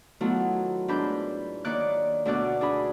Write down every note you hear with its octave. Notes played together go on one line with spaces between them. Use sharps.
D#3 F#3 A3 B3 E4 F4
G#2 D4 B4 B5 G6
D#3 A#3 C#5 D5 D6 F#6
D2 B2 D4 D5 F#6
D4 G#4 B5